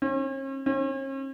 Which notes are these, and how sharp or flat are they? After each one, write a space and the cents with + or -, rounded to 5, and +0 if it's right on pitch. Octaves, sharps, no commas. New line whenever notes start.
C#4 -45
C#4 -45